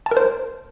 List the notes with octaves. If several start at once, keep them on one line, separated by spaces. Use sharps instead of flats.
A5
A#4
C5